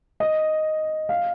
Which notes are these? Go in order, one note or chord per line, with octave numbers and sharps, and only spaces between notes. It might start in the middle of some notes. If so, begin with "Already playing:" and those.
D#5
F5